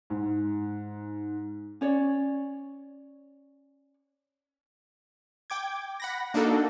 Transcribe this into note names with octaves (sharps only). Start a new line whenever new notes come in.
G#2
C#4 C#5 D5
G5 D6 G#6
F#5 B5 A#6
A#3 D4 D#4 F#4 A4